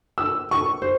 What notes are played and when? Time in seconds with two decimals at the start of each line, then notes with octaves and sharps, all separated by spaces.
0.18 E6
0.51 C#6
0.82 C5